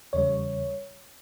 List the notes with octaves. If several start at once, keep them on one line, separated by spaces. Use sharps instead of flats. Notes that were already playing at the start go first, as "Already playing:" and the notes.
E2 C#3 G3 C#5